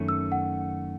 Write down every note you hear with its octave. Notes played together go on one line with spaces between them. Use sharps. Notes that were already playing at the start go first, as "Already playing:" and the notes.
Already playing: F#2 D#3 A3 C#4
E6
F#5